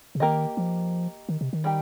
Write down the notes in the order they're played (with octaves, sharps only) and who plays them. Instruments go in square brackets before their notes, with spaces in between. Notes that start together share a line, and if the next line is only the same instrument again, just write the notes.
[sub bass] C3
[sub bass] D#3 [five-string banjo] A#3 G4 A#4 D#5
[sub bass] F3
D#3
C3
D#3
[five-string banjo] G3 D#4 G4